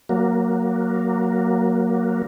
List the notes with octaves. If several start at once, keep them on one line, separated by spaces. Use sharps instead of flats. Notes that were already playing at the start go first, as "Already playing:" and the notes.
F#3 A#3